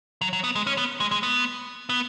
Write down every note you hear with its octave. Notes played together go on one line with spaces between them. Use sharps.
F#3
F#3
B3
G#3
C#4
B3
G#3
G#3
B3
B3